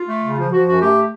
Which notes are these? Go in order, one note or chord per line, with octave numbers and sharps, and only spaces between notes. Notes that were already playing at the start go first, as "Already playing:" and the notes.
Already playing: F4
A3
C#3
F3
F3 F#4
F#2 F#4
A3 G4